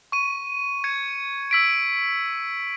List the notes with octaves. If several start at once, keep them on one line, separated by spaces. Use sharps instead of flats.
C#6 D#7
G#6 C#7
E6 B6 D7